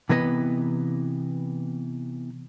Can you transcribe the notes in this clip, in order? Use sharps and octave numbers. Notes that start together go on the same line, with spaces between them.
C3 E3 B3 B4 D#5